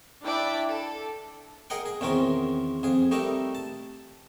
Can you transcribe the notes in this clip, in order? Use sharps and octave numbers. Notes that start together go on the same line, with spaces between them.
D4 E4 D5 E5 G5 D6
A4
G#4 A#4 D#5 F#5 G5
G#4
E2 D#3 C4 C#4 A#4
F2 G#4
G3 A3 D#4 A#4 E5
A5